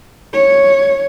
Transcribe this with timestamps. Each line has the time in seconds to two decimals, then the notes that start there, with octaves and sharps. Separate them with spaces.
0.33 C#5